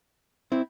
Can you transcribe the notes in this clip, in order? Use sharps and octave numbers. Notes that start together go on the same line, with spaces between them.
C4 E4